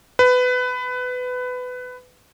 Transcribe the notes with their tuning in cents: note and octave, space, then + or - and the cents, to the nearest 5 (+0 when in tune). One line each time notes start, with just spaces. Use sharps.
B4 +20